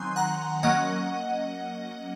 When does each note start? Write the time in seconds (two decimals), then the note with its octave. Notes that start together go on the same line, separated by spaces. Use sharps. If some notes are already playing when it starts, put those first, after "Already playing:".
Already playing: D#3 F#3 C4 G#5 C6
0.16 F#5 A#5
0.63 F#3 A#3 C#4 D#5 F#5